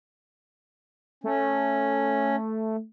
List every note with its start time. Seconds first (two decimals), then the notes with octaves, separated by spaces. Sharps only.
1.24 A3 C#4